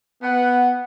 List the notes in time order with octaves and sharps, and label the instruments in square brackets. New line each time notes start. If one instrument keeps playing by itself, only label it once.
[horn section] B3 F#5